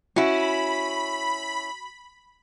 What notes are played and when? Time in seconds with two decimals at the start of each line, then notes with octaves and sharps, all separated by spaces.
0.16 C#4 E4 F#4 B5